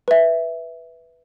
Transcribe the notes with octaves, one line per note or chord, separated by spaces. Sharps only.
B4 E5